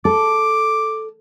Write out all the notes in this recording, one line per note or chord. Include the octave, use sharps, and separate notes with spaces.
A4 D6